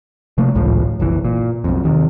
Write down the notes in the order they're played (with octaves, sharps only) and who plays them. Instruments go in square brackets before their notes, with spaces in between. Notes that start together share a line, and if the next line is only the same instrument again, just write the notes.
[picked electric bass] C3 F3 A3 A#3
G#1 C#2 A2 F3
F#1 B1 E3
A#2
B1 F2
D#2 C3 D#3